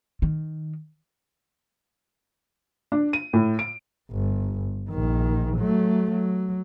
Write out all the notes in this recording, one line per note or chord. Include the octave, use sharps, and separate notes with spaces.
D#3
D4
D#7
A2
D7
G1
A#1 D#3
F#3 A3
F#3